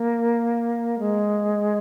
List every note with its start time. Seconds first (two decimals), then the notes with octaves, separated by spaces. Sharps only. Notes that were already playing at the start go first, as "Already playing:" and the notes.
Already playing: A#3
0.99 G#3